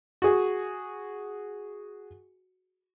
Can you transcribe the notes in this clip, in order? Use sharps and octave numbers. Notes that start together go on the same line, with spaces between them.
F#4 G#4